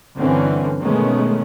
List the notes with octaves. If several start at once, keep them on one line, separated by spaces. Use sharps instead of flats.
G1 D3 E3 C4 C#4
B2 D#3 G#3 A3 B3 C#4